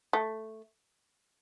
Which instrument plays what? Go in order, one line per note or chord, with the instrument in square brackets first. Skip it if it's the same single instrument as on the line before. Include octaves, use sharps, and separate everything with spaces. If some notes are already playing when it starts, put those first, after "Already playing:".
[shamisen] A3